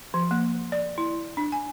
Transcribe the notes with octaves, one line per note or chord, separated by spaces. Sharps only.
F3
A#3
D5
E4
D4
G#5